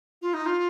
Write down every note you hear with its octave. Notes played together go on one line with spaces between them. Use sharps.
F4
D#4
F4